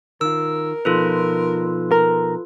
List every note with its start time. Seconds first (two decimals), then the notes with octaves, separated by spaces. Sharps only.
0.21 D#3 F4 A#4 E6
0.85 B2 F3 D#4 F4 A4 B4
1.92 A#4